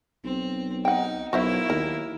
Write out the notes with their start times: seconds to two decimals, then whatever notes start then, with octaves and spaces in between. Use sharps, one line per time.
0.24 B1 C4
0.85 D#4 F#5 G5
1.33 B1 A#3 E4 F#4 C5 E5
1.70 D#2 A#4